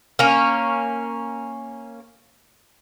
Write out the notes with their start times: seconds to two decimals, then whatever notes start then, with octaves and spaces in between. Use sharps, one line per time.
0.19 A#3 C#4